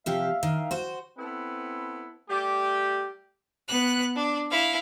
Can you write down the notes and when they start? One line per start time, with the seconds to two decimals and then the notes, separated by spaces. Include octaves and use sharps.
0.06 C3 F3 G4 E5 F5
0.43 D#3
0.71 F#4 C5
1.18 B3 C4 E4 A4 B4
2.29 G3 A3 G4
3.67 B3 F#6
4.16 D4
4.50 E4 F5